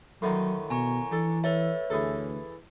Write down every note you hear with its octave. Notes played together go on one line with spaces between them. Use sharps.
A2 D3 D#3 F#3
B2 G#5 A#5 C#6
E3 D4 A4
A4 B4 C#5 E5
D2 E3 G#4 A4